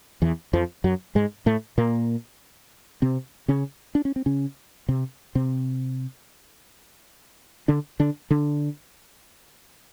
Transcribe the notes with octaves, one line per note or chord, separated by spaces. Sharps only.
E2 E3
F2 F3
F#2 F#3
G#2 G#3
A2 A3
A#2 A#3
C3 C4
C#3 C#4
D4
C#4
C4
C#3 C#4
C3 C4
C3 C4
D3 D4
D3 D4
D3 D4